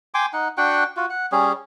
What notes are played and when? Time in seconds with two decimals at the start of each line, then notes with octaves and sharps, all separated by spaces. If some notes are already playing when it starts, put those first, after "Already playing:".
0.14 G5 G#5 C6 D6
0.33 D#4 F#5
0.57 D4 F#4 F#5 G5
0.97 F4 F#4
1.10 F#5
1.32 G3 C#4 G#4